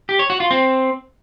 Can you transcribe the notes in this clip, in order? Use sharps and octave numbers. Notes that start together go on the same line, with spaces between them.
G4
C#5
F#4
F4
C4